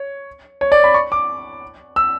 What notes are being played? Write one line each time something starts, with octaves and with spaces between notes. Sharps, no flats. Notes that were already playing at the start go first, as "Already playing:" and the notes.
Already playing: C#5
C#5
D5
B5
C#6
D6
E6